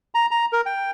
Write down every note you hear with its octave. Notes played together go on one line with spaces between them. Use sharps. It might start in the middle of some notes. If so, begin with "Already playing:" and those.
A#5
A#5
A#4
G5